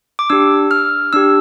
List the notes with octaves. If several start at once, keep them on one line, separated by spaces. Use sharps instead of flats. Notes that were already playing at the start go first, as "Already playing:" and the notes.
D6
D4 G4 E6
F6
D4 G4 E6